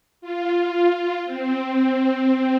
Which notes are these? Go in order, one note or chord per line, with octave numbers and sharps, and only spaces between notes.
F4
C4